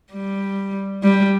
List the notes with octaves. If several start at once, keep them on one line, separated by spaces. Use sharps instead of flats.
G3
G3